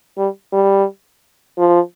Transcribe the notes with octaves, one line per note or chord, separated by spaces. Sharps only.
G3
G3
F3